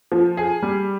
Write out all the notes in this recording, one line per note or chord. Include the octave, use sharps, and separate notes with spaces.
F3
G#4
G3